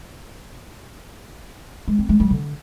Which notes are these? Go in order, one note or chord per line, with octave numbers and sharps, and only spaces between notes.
G#3
C4
G#3
G3
D3